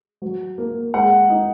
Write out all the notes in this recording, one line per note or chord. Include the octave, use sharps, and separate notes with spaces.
F#3
A#3
G#3 F#5
D#4